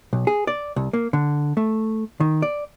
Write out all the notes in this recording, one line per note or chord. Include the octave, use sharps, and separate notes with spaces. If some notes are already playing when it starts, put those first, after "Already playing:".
B1
G#4
D5
C2
A#3
D3
A3
D#3
D5